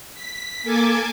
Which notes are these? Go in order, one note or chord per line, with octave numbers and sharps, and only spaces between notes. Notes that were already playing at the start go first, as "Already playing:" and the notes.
B6
A#3 A4 G#5 A5 D6 G#6